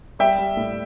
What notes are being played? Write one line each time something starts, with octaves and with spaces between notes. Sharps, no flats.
G3 E5 G5
G3
A2